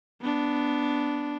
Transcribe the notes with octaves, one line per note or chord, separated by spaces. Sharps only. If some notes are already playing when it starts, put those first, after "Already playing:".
B3 D4